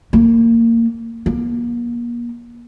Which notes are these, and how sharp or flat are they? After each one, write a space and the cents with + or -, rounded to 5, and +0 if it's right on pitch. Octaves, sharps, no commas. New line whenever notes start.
A#3 -20
A#3 +35